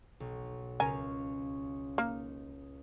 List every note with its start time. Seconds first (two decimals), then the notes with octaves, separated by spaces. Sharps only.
0.20 B1
0.80 C#2 C#4 A#4 F5 G#5
1.98 A#3 D#4